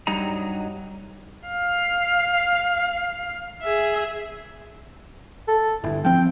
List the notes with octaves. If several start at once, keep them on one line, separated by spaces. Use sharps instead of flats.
G2 F#3 G3 D#4 D#5 A#5
F5
G#4 E5
A4
G1 E4
F3 C4 G5